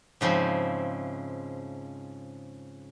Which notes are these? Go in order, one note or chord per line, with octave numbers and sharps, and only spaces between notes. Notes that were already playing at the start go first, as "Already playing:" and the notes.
G#2 C#3 F3 C4 E4